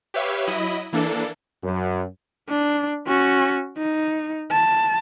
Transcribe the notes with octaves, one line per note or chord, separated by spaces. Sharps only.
G4 B4 C#5 E5 F5
F#3 E4 D#5 B5 D#7
E3 A#3 D4 A4
F#2
D4
C#4 F#4
D#4
A5